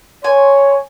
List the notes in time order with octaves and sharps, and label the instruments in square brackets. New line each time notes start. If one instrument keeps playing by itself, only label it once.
[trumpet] C#5 [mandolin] G#5 [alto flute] C6